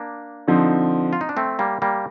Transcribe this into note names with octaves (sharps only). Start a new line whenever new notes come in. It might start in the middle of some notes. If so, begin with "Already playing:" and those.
Already playing: A#3 D4
D3 F3 C4 D#4
F4
D#4
D4
A3 C4
G3 A#3
G3 A#3